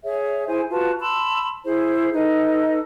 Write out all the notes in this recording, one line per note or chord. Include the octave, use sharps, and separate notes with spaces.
G#4 C#5 E5
E4 G#4 C5 G#5
F4 F#4 B4 A5
A5 B5 C6 E6
E4 G#4 C5
D#4 A4 B4 D#5